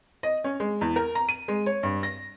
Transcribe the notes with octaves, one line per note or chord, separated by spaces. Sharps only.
D#5
C#4
G#3
E2
A#4
A#5
D#7
G#3
C#5
G2
A#6